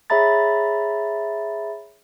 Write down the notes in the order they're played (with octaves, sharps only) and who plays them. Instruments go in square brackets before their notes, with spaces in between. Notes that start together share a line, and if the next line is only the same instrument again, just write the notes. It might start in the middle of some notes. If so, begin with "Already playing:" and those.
[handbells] G#4 C#5 E5 A#5 B5 A6